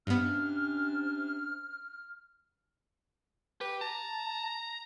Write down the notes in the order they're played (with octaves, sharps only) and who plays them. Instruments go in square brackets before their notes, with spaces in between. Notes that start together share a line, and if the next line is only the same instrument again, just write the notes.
[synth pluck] G2 B3 [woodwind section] C3 C#4 D4 [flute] F6
[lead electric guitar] G4 [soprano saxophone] B4
[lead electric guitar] A5 [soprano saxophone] A#5